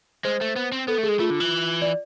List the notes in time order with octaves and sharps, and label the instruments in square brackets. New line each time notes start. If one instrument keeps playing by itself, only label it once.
[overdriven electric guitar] G#3 [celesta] C5
[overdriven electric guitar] A3
B3
C4
[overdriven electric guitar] B3 [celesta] A4
[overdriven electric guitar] A3
[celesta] G#4
[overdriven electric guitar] G#3
[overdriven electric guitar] A3 [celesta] F4
[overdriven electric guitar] D3
E3
[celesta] D5